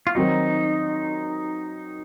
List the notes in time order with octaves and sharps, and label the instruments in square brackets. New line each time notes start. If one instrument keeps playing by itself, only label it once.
[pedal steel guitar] F4
[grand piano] D#3 F#3 C4 F#4 [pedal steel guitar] D#4